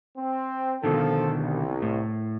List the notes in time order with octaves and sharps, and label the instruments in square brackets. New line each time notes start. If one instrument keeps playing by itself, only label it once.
[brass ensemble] C4
[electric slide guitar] B2 D3 D#3 [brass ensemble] F3 A4
[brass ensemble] C2
[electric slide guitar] A2